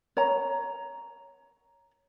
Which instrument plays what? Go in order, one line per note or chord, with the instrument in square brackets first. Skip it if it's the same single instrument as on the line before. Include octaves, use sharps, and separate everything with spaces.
[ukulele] C#5 A#5